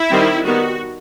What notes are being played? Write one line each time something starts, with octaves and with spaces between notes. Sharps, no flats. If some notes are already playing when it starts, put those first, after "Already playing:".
Already playing: E4
D#3 G3 C4
D#3 G3 B3 F#4